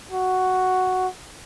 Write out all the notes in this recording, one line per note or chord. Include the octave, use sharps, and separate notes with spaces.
F#4